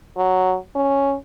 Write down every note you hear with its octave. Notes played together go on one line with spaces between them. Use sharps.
F#3
C#4